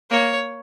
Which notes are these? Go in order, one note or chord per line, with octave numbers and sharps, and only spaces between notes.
A#3 C#5